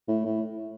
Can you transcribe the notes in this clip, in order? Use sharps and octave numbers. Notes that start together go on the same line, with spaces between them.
A2
A2